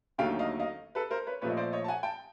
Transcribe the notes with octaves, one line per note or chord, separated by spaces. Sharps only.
D#2 D3 F#3 A3 F5 G5
D#5 F5
D#5 F5
A4 B4
A#4 C5
B4 C#5
A#2 F3 A3 B4 C#5
D#5
C5 D5
C#5 D#5
A5
F#5 G#5
G5 A5